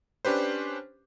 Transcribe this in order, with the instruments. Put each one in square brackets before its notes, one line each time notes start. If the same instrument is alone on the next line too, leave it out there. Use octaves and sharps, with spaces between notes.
[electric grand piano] C#4 D4 G4 B4 C5